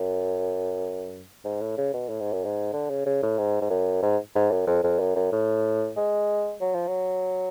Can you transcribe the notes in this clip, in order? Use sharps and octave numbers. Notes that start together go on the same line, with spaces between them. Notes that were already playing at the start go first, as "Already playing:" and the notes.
Already playing: F#2
G#2
A2
C#3
B2
A2
G#2
F#2
G#2
D3
C#3
C#3
A2
G#2
G#2
F#2
G#2
G#2
F#2
F2
F2
F#2
F#2
A2
G#3
F#3
F3
F#3